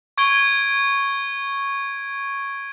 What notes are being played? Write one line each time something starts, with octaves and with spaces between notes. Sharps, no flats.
C#6 G#6 D7 G7